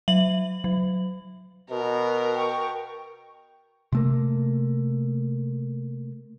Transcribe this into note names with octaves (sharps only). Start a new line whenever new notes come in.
F#3 E5 F#7
F#3
B2 A#4
G5 C#6
C3 A3 A#3